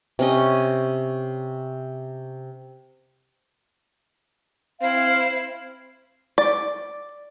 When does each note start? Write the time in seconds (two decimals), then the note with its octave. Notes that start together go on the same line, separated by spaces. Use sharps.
0.19 C3 C#4 D#5
4.81 C4 E4 F5
6.38 D5